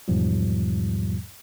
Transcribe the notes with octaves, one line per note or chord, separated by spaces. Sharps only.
E2 G#2 B2 F3 G3